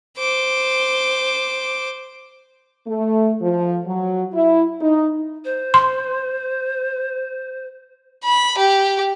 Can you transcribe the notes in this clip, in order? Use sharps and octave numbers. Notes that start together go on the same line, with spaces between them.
C5 D6
A3
F3
F#3
E4
D#4
C5
C6
B5
G4